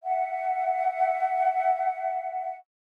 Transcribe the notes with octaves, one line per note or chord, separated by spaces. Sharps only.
E5 F#5